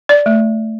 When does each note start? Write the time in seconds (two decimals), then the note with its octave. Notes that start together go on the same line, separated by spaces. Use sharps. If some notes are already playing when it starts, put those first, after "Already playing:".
0.09 D5
0.26 A3